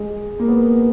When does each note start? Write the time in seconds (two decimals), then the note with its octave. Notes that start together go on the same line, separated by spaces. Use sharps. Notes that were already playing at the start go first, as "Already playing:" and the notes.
Already playing: G#3
0.39 A#3
0.48 B3